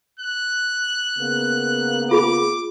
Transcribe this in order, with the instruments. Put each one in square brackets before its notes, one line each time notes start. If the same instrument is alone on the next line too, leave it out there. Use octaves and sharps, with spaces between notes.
[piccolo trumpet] F#6
[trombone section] C#3 A#3 B3
[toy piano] F4 G#4 B5 [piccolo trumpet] D6